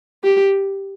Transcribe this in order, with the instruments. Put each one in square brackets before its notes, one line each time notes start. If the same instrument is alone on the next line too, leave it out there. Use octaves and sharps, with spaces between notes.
[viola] G4